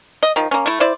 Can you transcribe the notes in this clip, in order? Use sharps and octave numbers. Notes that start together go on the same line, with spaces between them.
D#5
D#3 F3
A#3 C#4
A3 E4
E4 C5 D5